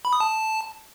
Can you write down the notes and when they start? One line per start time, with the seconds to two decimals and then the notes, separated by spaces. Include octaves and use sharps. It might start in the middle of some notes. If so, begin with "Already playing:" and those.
0.05 B5
0.13 D#6
0.20 A5